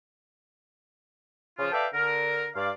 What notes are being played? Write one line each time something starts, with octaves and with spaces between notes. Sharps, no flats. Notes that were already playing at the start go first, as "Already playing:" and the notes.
C#3 F3 F4
A4 B4 D5 E5 F5 G5
D3 A#4
G2 D5 F5